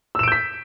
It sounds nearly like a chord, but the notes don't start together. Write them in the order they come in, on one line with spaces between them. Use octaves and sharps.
E6 E7 D7 G6 B6